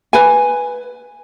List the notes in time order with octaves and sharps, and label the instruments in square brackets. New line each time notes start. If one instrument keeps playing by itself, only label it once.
[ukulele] B4 G#5